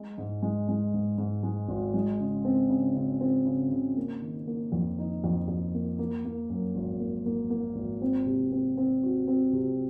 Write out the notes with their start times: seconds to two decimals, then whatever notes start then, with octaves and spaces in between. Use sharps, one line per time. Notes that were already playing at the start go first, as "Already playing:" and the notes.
Already playing: G#3
0.18 G#2
0.42 G#3
0.69 G#3
0.94 G#2
1.18 G#2
1.43 G#3
1.69 G#1
1.94 G#3
2.20 C#3
2.45 C4
2.70 C#3
2.96 C#3
3.21 C4
3.46 C#3
3.71 C#3
3.97 A#3
4.22 D#3
4.47 A#3
4.72 F2
4.99 D#4
5.24 F2
5.48 F2
5.74 A#3
5.99 A#3
6.25 A#3
6.50 F#2
6.75 G#1
7.00 A#3
7.26 A#3
7.50 A#3
7.76 G#1
8.02 C4
8.26 C3
8.52 C4
8.77 C4
9.03 F#4
9.27 C4
9.53 C3